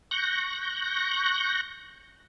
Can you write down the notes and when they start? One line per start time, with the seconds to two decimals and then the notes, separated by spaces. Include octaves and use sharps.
0.11 C#6 F#6 G6 A#6